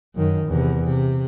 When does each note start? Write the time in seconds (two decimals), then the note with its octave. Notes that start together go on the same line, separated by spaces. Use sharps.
0.15 F#2 D#3
0.47 E2 C3
0.84 C3